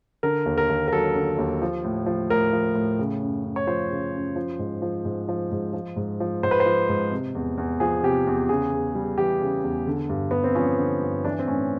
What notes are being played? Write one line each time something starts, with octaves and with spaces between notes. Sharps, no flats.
D3 A#4
D#2
A#4
D#2
A#4
F#3 A4
D3
D#2
F3
A2
F3
A2 A#4
F3
A2
C#3
F#2
F#2
C#5
F3 C5
C#3
F#2
F3
G#2
F3
G#2
F3
G#2
F3
G#2
F3
G#2 C5
B4
C5
F3
G#2
C3
E2
E2
F3 G#4
C3 G4
E2
C#3 G#4
E2
G3
E3 G4
C#3
E2
D3
G2
G2 B3
C4
F3 C#4
D3
G2
E3 D4
C4
A2 C#4